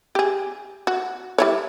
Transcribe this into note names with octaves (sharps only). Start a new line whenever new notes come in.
G4 G#4
F#4
G3 E4 C#5